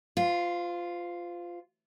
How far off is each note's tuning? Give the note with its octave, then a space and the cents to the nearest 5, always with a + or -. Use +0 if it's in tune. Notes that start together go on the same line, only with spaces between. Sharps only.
F4 +0 C5 -35